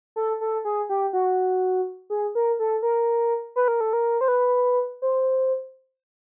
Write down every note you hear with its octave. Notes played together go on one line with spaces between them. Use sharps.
A4
A4
G#4
G4
F#4
G#4
A#4
A4
A#4
B4
A#4
A4
A#4
C5
B4
C5